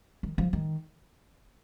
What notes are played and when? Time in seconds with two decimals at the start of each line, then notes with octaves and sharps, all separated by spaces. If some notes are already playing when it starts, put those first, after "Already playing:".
0.23 D#3
0.38 F3
0.53 D#3